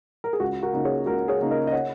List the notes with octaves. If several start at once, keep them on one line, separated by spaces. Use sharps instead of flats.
A#4
G#4
C#2 F#4
F#4 A#4
C#3 A#3 D#4
G#4 C#5
C#2 F#4 A#4
G#4 C#5
C#3 A#3 D#4
A#4 D#5
D#5
C#5 F#5